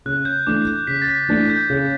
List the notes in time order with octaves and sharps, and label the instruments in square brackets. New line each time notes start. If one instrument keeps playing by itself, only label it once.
[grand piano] C#3 [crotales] F#6
[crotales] G6
[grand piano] E3 A3 D4 [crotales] D6
[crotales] G6
[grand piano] C#3 [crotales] B6
[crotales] A6
B6
[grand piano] E3 A3 D4 [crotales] A6
[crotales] G6
[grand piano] C#3